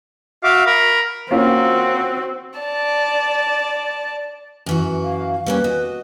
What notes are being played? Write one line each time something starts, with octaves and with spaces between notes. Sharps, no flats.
F#4 E5 F5 D6
A#4 B5
A#3 C4 C#4 F4 F#4
D5 A5
F#2 E3 F#4
F5
G3 A#3 C#4 B4
F#4 D#5